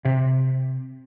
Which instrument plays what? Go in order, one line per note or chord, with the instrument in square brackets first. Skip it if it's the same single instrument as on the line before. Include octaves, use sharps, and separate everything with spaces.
[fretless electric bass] C3